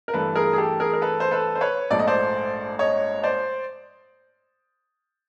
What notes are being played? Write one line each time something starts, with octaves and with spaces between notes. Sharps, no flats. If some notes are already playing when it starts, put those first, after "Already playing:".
A#4
G2 E3 A3 A4 B4
G#4 A#4
G#4
G4 A4
G#4 A#4
A#4
A4 B4
C5
A4 B4
C5
B4 C#5
A#1 G#2 F3 A3 D5
D#5
C5 D5
C#5 D#5
C5 D5